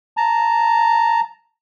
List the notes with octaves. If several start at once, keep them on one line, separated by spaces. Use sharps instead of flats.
A5 A#5